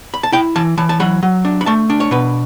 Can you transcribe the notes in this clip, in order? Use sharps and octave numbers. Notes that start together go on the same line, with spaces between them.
B5
A5
E4 G5
E3 A5
E3 A5
A5
F#3 B5
F#3
D4
B5
A3 A5
D4
C#5
B2 B4